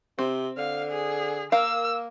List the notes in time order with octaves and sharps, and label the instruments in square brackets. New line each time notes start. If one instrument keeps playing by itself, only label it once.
[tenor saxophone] C3 [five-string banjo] C4
[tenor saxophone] D3 [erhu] F5
[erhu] G#4
[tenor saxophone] A#3 [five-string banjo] A#4 F5 [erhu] E6